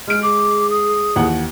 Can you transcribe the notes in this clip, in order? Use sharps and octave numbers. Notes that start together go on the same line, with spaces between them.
G#3 F6 D7
G#4 D6
D#6
D#2 E3 F#5